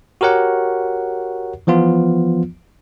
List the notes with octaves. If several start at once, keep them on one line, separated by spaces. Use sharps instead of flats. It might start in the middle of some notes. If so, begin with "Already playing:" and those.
F#4 G4 A#4 C#5 F#5
E3 F3 B3 F4